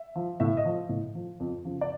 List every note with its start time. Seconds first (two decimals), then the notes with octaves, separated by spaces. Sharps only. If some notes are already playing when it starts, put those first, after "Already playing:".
Already playing: E5
0.15 F3
0.40 A2 E5
0.57 D#5
0.65 F3
0.89 A2
1.15 F3
1.40 F2
1.65 C#3 F3
1.81 D5